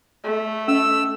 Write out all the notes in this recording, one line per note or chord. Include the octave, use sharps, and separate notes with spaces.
A3
C#4 D#5 E6